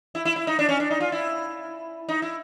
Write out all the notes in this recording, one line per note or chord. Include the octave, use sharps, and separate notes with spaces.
E4
E4
E4
D#4
D4
C#4
D4
D#4
F4
E4
D#4
E4